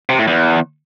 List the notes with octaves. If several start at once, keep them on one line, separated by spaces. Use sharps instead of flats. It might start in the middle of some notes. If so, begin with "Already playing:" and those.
C3
A2
E2